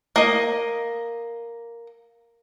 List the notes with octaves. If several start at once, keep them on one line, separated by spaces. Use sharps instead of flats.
A#3 D#5